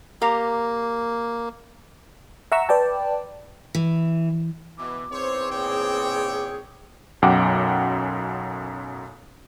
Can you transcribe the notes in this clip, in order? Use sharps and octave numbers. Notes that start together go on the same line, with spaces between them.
A#3 G4 A#4 F5
E5 F#5 A#5 C#6 E6
B4 D5 G5 A5
E3
B2 E3 D6
E2 G#2 C4 C5 C#5
A#2 G#4 C#5 G5
B1 F#2 F#5 G5 D6